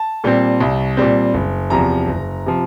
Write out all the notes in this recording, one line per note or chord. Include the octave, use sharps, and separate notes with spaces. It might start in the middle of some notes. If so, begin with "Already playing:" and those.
Already playing: A5
A#2 G3 C4
C2
A#2 G3 C4
F#1
E2 C3 F3 A#5
F#1
C3 F3